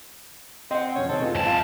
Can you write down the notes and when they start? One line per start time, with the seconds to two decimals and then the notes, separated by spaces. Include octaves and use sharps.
0.71 C4 D#5 F#5
0.95 F2 B2 C#4 C#5
1.09 C3 D#3 C4 A4
1.21 G#3 B3 F4
1.35 F#2 C4 G#5 A5
1.47 F4 F5